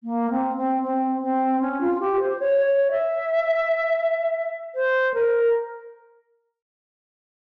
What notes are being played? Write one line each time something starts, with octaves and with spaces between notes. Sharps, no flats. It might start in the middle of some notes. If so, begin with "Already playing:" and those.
A#3
C4
C4
C4
C4
C#4
F4
G4
C5
C#5
C#5
E5
C5
A#4